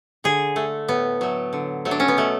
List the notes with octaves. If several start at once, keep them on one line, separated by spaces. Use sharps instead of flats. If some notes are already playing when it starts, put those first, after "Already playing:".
D3 G#4
A3
A2 B3
F#3 A3
D3
F#3 A3
D4
C#4
B3
B2 A3